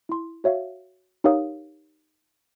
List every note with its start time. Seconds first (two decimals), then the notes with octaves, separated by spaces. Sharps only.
0.09 E4 C6
0.44 F#4 C#5 E5 F5
1.24 D#4 G4 A#4 C#5 F5 D#6